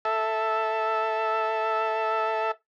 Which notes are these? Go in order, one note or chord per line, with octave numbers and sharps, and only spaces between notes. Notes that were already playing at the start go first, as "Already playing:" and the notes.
A4 E5